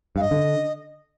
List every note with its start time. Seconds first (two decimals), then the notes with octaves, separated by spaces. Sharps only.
0.16 G2 F5
0.21 D#5
0.31 D3